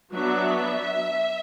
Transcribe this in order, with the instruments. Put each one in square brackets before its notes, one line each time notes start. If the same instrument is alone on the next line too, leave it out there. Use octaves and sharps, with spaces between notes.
[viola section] F#3 B3 D4 [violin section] E5